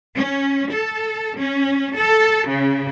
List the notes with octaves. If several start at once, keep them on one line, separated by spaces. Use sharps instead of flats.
C#4
A4
C#4
A4
C#3